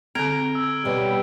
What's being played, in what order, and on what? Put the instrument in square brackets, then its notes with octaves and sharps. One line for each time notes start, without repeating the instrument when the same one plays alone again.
[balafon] D3 C4 [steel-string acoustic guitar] A#5 [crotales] F6 G#6 D7
[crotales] E6
[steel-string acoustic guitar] B2 B3 C#5 [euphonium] G3